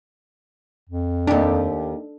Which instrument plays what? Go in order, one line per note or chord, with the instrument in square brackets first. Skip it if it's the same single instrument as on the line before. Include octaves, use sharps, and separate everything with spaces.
[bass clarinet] F2
[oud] D#2 G4 [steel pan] D4 A4